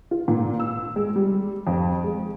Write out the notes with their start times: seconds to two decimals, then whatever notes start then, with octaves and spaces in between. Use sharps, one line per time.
0.11 F4
0.28 A#2
0.60 E6
0.96 G#3
1.16 G3
1.67 F2
2.04 G#3